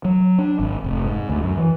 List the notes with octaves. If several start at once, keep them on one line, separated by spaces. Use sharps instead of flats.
F#3
D4
G#1
F1
G#2
D2
F#2
E3